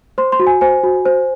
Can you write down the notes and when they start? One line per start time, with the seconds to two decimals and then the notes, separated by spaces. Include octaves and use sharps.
0.18 C5 C6
0.32 C6
0.40 F#4
0.47 G#5
0.61 C5 G#5
0.84 F#4
1.06 C5